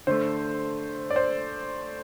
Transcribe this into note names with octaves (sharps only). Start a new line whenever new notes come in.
D3 A3 C5
D5
C5